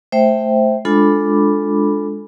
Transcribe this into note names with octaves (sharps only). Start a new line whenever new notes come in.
A3 C5 E5 G5
G#3 D4 F4 A4 B5 D6